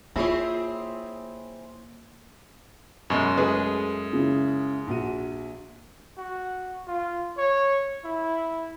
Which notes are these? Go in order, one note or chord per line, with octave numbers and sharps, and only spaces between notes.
A#3 C4 E4 F4 G#4 C#5 E5
F#2 B2 G#3 A4
G#3 A3 G#4 B4
C#3 E4
A#1 F#4 D#7
F#4
F4
C#5
E4